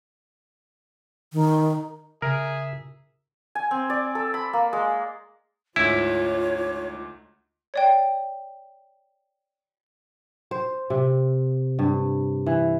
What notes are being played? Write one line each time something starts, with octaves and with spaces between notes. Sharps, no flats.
D#3
C#3 G#4 A#4 E5
G#5
C4
D5
A4
B5
A#3
G#3
D2 G#2 E4 F4 C#5
C#5 D5 G5
C5
C3
G2
E3